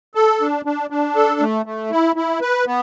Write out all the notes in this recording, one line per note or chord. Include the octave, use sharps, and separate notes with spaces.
A4
D4
D4
D4
A4
A3
A3
E4
E4
B4
B3